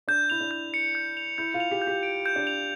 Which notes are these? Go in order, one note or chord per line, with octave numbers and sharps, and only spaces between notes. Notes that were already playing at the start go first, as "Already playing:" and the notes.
D4 G6
E4 F7
D4
G6
C#7
G6
F7
E4 G6
F4
F7
G4
G6
G4
D7
G6
D4
F7